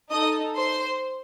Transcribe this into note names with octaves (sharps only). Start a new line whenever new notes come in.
D#4 A4 D#5 D#6
C5 C6